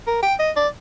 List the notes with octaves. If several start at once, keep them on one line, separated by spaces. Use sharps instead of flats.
A#4
G5
D#5
D5